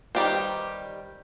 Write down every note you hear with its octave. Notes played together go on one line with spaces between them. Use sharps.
D#3 G3 G4 B4 C5